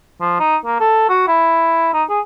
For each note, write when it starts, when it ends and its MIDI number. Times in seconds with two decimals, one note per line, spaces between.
0.21 0.39 53
0.40 0.56 63
0.66 0.80 58
0.80 1.06 69
1.09 1.28 66
1.28 1.90 64
1.93 2.04 63
2.10 2.20 68